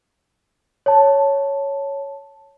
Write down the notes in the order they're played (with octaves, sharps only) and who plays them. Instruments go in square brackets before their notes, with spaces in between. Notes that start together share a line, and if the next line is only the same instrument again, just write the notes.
[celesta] C#5 A5